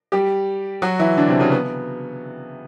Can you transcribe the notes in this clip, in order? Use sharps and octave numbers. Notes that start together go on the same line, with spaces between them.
G3 G4
F#3 F#4
E3 E4
D3 D4
C3 C4
C#3 C#4
B3